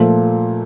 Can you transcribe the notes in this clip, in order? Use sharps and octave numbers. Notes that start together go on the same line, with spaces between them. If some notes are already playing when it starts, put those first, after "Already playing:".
Already playing: A#2 F3 A3